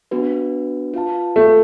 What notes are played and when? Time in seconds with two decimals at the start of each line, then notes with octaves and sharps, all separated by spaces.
0.11 B3 D4 F#4 B4
0.94 F4 B4 F5 A5
1.36 A3